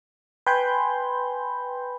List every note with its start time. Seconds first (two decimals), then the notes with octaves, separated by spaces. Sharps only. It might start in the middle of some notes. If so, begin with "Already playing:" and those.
0.46 B4 G5 G#5 B5 C6 G6